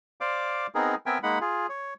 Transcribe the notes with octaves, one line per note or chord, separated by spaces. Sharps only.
C5 D5 F5 D6
B3 C4 D#4 G#4 A#4
B3 C4 A#4 E5 G5 G#5
G#3 A#3 D#4 F#5 B5
F4 G#4
C#5